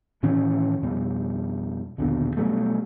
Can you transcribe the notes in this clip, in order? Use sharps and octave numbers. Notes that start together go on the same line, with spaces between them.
A2 D#3 E3 C#4
F2 B2 G3
A#1 D#2 B2 D3
B2 F#3 G3 A3